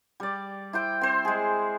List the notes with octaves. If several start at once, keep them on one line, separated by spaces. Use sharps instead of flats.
G3 D5
E4 C5 G5
C4 C5
G#3 G#4